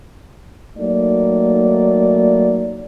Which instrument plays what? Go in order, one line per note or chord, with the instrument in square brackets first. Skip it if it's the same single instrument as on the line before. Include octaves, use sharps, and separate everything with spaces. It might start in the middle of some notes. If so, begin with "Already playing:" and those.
[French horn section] F#3 A3 A#3 D#4 D5